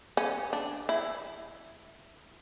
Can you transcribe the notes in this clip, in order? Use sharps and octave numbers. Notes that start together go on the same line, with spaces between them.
C#4
D4
E4